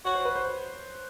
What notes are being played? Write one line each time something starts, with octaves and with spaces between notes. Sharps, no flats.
F#4 C#5
C5
B4
C5